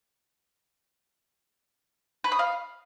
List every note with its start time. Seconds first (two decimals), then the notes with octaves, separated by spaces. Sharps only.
2.24 B4
2.32 D#6
2.39 F5